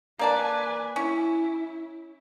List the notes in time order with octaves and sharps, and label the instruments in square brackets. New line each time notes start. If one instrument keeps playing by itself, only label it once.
[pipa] A#3 D5 A5 [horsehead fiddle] B4 G#5
[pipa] C#4 [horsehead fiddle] E4